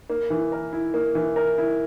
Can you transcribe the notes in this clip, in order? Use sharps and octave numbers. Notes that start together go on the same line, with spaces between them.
A#3
E3
A#4
E4
A#3
E3
A#4
E4